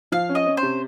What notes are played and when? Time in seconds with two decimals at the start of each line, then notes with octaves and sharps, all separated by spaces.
0.12 F3 F5
0.29 C#4
0.35 D#5
0.46 C#4
0.57 C5
0.63 C3